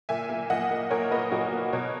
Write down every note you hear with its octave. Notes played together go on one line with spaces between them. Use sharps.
A#2 E5 G#5
A#3
A#2 D#5 F#5
A#3
A#2 A#4 C#5
A#3 B4 D#5
A#2 F#4 A#4
A#3
B2 A#4 C#5